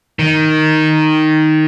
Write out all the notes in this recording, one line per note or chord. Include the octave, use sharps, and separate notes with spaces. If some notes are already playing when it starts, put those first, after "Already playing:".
D#3